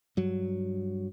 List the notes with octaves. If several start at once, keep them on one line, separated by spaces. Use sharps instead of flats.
G2 F#3